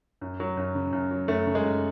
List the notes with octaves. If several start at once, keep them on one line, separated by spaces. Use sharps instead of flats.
F#2
F#3
F#2
C#3
F#2
F#3
F#2 A3
C#3
G#3
F#2